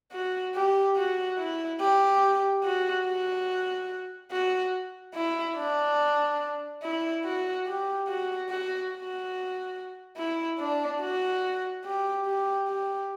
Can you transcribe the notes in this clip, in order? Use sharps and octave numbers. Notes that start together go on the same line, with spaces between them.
F#4
G4
F#4
E4
G4
F#4
F#4
F#4
E4
D4
E4
F#4
G4
F#4
F#4
F#4
E4
D4
F#4
G4
G4
G4